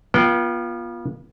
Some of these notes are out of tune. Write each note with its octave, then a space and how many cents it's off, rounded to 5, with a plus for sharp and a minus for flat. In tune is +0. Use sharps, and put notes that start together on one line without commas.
B3 -35 F4 +0 G5 -20